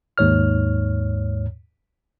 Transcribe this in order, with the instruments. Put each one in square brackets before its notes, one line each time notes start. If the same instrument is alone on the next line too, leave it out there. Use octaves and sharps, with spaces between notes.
[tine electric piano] D#2 G#2 C#5 F6